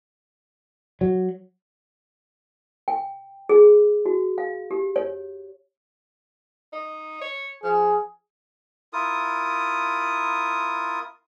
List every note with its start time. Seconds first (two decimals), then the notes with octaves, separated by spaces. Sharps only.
1.01 F#3
2.88 G5
3.49 G#4
4.06 F#4
4.38 F5
4.71 G4
4.96 C#5
6.73 D#4
7.21 C#5
7.64 F3 G#4
8.93 E4 F4 A#4 D#6